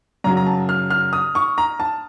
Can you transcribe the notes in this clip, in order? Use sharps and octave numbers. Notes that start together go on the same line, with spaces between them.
F#2 C#3 F#3 A#5
A#5
A5
F6
F6
D#6
C#6
A#5
A5